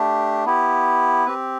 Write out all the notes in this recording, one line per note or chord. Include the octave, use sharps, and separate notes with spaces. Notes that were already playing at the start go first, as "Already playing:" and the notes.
Already playing: A3 D4 G4
B3 E4 G4
C4 G4 B4